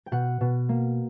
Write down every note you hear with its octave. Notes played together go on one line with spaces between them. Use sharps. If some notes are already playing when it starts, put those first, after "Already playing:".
G5
B2 F#5
B2
A#3